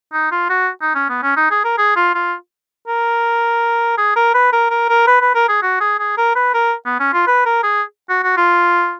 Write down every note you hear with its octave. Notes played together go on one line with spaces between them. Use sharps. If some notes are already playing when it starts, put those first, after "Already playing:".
D#4
F4
F#4
D#4
C#4
B3
C#4
D#4
G#4
A#4
G#4
F4
F4
A#4
G#4
A#4
B4
A#4
A#4
A#4
B4
B4
A#4
G#4
F#4
G#4
G#4
A#4
B4
A#4
B3
C#4
F4
B4
A#4
G#4
F#4
F#4
F4